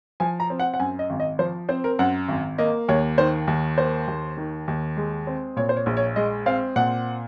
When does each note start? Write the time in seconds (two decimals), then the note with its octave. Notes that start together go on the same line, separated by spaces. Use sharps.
0.20 F3 G#5
0.40 A#5
0.50 C4
0.60 F#5
0.74 F#5
0.80 F#2 G#5
0.99 D#5
1.10 G#1
1.20 D#5
1.39 F3 C5
1.69 C4 C5
1.84 A#4
1.99 F#2 F#5
2.28 G#1
2.58 A#3 D#5
2.88 D#2 C#5
3.18 D#3 C5
3.47 D#2
3.78 A#3 C5
4.08 D#2
4.37 D#3
4.68 D#2
4.97 G#3
5.27 C4
5.56 A#2 C#5
5.69 C5
5.77 C#5
5.86 A#1
5.97 C#5
6.16 G#3 D#5
6.46 C4 F5
6.76 A#2 F#5